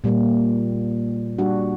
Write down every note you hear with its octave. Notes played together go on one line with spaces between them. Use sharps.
A#2 G3 A#3
G3 D4 F#4